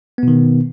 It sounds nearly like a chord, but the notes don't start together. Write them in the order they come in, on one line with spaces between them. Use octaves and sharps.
B3 B2 D#3